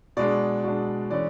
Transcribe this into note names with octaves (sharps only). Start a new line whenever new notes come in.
B2 G#3 D4 D5
B2 G#3 D4
E3 G#3 C#4 D5